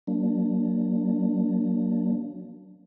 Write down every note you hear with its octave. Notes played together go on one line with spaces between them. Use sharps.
F#3 A#3 D4